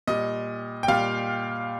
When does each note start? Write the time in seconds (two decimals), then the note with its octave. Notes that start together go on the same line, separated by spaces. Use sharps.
0.07 A#2 G3 D#5
0.83 G5
0.88 A#2 G3 F5